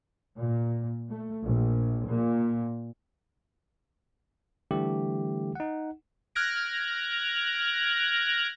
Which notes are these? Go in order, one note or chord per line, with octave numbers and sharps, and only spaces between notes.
A#2
A3
A#1
A#2
D3 E3 G3 A3 G4
D#4 F#5
F6 F#6 G#6 A#6 D7